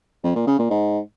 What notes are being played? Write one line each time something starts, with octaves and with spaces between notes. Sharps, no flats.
F2
A#2
C#3
A#2
G#2